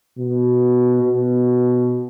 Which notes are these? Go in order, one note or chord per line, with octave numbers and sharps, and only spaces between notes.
B2
B2